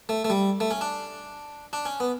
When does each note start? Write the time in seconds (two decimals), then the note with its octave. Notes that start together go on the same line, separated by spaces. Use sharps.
0.09 A3
0.24 A3
0.30 G3
0.60 A3
0.71 C#4
0.81 D4
1.73 D4
1.85 C#4
2.00 B3